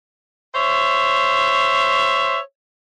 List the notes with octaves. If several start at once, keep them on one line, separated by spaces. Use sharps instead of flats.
C5 C#5 E5